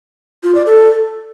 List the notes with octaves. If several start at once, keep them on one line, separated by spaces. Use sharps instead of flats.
F4
D5
A4